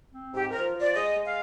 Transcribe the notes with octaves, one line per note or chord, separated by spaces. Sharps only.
C4
G#2 G4
F3 A#4
F3
D5
G#3 D#5
G#3
F5